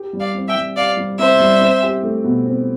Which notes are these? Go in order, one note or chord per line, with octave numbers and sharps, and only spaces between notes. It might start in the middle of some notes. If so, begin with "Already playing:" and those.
Already playing: G4
G3
D5 F5
C4
E5 G5
G3
G4 D5 F5
G3
C4 C5 E5
G3
C4
G4
A3
B2
C4